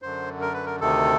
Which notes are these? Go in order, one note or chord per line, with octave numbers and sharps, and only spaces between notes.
F#2 D3 C5
A#4
B4
A#4
D2 C3 D#3 A4